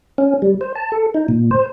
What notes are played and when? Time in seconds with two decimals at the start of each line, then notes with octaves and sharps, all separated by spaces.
0.18 C#4
0.42 G3
0.61 C5
0.75 A5
0.92 A4
1.14 D#4
1.28 A#2
1.51 C5